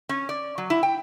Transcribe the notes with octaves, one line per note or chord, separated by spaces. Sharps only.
C#4
D5
F#3
E4
G5